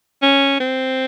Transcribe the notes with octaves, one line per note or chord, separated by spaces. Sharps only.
C#4
C4